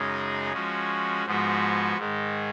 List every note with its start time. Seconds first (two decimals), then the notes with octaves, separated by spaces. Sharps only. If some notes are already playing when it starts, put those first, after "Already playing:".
Already playing: F#2 C#3 G#3 D#4 G#4
0.53 F3 G#3 C#4 F#4
1.26 G#2 F3 G#3 B3 F#4
1.97 G#2 D#3 G#3